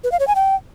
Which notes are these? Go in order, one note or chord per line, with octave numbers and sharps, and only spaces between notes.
B4
F5
C#5
G#5
G5